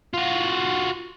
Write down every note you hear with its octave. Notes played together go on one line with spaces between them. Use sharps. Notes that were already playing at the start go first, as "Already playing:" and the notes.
F4 F#4